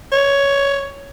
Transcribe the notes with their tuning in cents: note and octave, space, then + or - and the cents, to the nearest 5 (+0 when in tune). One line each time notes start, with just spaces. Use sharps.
C#5 +10